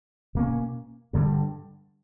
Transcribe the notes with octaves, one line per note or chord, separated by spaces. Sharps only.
B2 A#3 C#4
G2 D3 G3